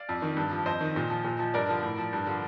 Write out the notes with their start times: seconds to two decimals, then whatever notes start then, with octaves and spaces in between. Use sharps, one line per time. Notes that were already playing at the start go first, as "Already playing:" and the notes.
Already playing: D5 F5
0.09 F2
0.22 D#3
0.37 G2
0.51 F3
0.66 F2 C5 D#5
0.81 D#3
0.96 A#2
1.10 F3
1.25 A#2
1.39 F3
1.54 G2 A#4 D5
1.69 D3 F3
1.83 A2
1.98 F3
2.13 G2
2.27 D3 F3